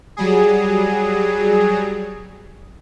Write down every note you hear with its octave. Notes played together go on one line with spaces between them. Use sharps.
F#3 G3 G#4